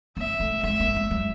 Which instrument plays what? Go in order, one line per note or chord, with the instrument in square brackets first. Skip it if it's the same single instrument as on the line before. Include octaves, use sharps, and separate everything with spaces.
[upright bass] A#3 [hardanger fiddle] E5
[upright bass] A3
[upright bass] G#3 [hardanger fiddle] E5
[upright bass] A#3
G#3
F#3